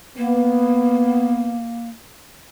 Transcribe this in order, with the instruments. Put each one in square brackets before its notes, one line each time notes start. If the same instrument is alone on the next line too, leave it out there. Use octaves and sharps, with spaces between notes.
[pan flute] A#3 [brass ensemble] B3